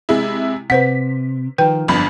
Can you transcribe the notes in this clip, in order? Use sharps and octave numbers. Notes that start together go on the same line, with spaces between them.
C3 G#3 E4
C3 B4 C5 F#5 B6
D#3 F3 B4 G5
G1 F2 F3 D4 B5